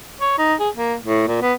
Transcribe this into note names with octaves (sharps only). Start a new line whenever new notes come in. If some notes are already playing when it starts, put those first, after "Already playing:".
C#5
D#4
G#4
A#3
A2
A#2
B3